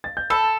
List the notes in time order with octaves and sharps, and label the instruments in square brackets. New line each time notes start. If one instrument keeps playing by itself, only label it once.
[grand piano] A6
G6
[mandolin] A4 [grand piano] B5 E6